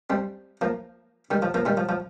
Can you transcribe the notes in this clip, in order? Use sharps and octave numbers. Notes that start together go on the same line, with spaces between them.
G3 C4
F3 A#3
D#3 G3
F3
F3 A#3
D#3 G3
F3
F3